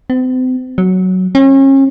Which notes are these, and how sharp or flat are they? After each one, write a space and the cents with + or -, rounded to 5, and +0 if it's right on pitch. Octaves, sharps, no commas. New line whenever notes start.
C4 -40
F#3 +5
C#4 -35